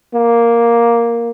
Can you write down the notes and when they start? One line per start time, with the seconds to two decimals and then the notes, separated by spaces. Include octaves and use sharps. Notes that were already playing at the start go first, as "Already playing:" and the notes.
0.14 A#3